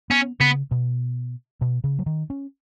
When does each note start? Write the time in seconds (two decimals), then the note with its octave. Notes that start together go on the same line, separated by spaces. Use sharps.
0.10 B3 C#4
0.40 C#3 B3
0.71 B2
1.61 B2
1.84 C#3
1.99 F#3
2.06 D#3
2.30 C#4